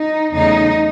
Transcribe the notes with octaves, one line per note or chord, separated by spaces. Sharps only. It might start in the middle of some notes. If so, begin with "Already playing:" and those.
Already playing: D#4
E2 C#3 F#3 A3 D#4